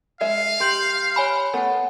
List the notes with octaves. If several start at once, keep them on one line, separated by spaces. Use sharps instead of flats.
G#3 E5 F5
G4 C6 G6 F#7
C#5 G#5 B5
A3 B3 F#5